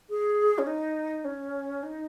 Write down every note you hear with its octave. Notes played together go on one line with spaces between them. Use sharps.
G#4
C#4
D#4
C#4
D#4